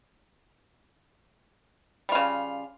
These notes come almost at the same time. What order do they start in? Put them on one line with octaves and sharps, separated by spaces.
G3 F4 C#3